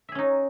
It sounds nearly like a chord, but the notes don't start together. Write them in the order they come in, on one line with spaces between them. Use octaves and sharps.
E5 G#4 C#4 D#4